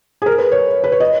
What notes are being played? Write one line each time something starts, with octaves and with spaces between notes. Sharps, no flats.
G#4
A#4
B4
C#5
B4
C#5
D#5